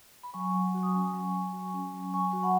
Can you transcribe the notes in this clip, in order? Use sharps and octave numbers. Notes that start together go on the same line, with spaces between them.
B5
F#3 G#5 C#6
F#3
F#4
D#6
C#4 G#5 C#6
F#3
F#3
F#4
C#4
F#3
F#3 G#5 C#6
F#4 C#6
F#5 B5